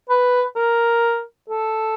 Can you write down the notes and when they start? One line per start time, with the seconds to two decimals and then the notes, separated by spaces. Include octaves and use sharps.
0.10 B4
0.56 A#4
1.49 A4